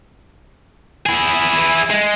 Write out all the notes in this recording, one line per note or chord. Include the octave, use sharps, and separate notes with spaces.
E4 G#4
G#3